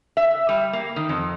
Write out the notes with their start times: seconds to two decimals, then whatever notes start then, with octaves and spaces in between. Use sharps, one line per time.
0.17 E5
0.49 G3
0.73 A#3
0.96 D#3
1.09 F2